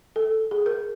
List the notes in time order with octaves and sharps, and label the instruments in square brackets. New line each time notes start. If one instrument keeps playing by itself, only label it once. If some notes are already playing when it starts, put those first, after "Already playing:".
[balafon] A4
G#4
A#4